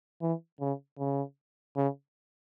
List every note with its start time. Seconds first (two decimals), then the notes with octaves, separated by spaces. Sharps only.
0.21 E3
0.60 C#3
0.99 C#3
1.76 C#3